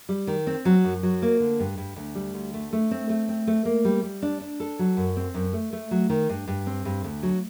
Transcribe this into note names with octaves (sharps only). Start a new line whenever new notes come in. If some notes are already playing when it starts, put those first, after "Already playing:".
G3
D#3
C4
F#3
F#2
F#3
A#3
D3
G2
G2
D2
G3
D2
A3
A3
C4
A3
C4
A3
A#3
G3
G3
D4
D4
A4
F#3
F#2
C4
F#2
A3
A3
F#3
D#3
G2
G2
C4
G2
D2
F#3